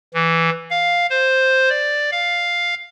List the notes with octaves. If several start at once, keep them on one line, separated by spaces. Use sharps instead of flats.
E3
F5
C5
D5
F5